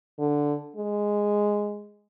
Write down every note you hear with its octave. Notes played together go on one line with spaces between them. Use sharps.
D3
G#3